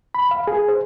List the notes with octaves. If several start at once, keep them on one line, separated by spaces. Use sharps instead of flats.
B5
F5
G#4
C5